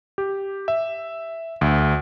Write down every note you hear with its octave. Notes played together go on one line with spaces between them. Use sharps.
G4
E5
D2